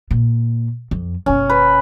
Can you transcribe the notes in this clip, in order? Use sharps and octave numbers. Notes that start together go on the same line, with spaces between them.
A#2
F2
F#1 B2 C#4
B4